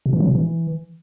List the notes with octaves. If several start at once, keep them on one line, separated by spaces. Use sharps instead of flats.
B2
E3
F#3
B2
E3